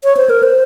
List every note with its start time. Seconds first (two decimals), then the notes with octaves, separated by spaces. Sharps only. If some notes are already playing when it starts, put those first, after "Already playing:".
0.04 C#5
0.17 C5
0.30 A#4
0.43 C5